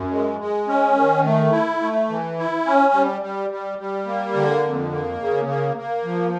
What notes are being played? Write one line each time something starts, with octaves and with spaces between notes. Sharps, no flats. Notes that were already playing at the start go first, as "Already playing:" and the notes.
Already playing: F#2
G#3
G#3
C#4
D#3
A3
E4
A3
E3
E4
C#4
G3
G3
G3
G3
A#3
D3
F2
A#3
C#3
A#3
A#3
F3